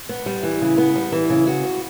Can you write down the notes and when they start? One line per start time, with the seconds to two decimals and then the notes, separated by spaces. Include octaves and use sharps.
0.09 B3
0.26 G3
0.43 E3
0.61 C#3
0.78 B3
0.95 G3
1.12 E3
1.30 C#3
1.47 F#4
1.64 B3